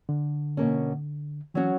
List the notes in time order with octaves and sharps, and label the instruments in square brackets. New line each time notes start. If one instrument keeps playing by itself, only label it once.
[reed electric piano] D3
[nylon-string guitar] B2 A#3 C#4
[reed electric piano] E3 [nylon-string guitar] F#3 C#4 F#4 C#5